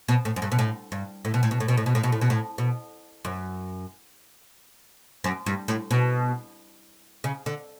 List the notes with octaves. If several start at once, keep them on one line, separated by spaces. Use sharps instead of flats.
B2
A2
F#2
G2
B2
A2
G2
A2
B2
A2
B2
A2
B2
A2
B2
A2
B2
A2
B2
A2
B2
F#2
F#2
G2
A2
B2
C#3
D3